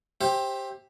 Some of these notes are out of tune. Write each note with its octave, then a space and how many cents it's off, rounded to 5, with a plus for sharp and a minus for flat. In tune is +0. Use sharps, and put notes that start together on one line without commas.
G4 +0 C5 +20 E5 +0